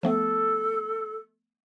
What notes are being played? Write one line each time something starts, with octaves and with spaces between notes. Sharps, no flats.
F3 A3 B3 A4